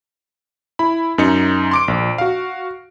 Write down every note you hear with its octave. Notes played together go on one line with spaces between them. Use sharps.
E4 B5
F#2 D#4 C#7
C6 D6 D7
A#1
F#4 F5